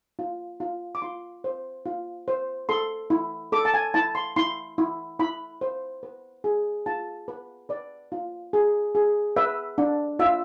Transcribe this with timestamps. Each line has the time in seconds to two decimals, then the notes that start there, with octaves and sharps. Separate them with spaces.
0.19 F4
0.60 F4
0.95 D6
1.02 F4 C6
1.44 C5
1.86 F4
2.28 C5
2.69 A4 C6
3.10 E4
3.52 A4 D6
3.65 A5
3.74 G#5
3.94 E4 A5
4.15 C6
4.36 E4 C6
4.78 E4
5.19 E4 B5
5.61 C5
6.03 B4
6.44 G#4
6.86 F4 A5
7.28 B4
7.69 B4 D5
8.12 F4
8.53 G#4
8.95 G#4
9.36 B4 E5
9.78 D4
10.19 F4 E5